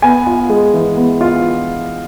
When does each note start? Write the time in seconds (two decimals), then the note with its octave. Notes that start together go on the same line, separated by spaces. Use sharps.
0.02 B3 G#5
0.27 F4
0.49 G#3
0.74 E3
0.97 B3
1.21 F4